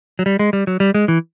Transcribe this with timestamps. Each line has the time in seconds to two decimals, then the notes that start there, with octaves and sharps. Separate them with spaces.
0.19 F#3
0.26 G3
0.39 G#3
0.53 G3
0.67 F#3
0.80 G3
0.95 G#3
1.08 E3